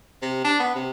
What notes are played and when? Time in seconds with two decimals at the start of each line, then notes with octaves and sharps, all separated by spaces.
0.22 C3
0.44 D4
0.60 B3
0.75 C3